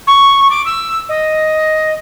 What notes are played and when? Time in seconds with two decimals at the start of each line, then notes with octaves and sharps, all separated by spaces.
0.07 C#6
0.50 D6
0.66 E6
1.09 D#5